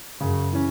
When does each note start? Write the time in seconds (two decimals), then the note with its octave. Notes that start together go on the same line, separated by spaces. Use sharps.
0.20 F#2 C#3
0.53 E3 C#4